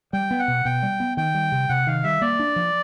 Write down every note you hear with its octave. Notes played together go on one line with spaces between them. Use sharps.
G3 G5
B3
F#5
B2
B2 G5
G3
B3
D#3 G5
G3
C3
C3 F#5
D#3 F5
G3 E5
A#3 D5
D4
F3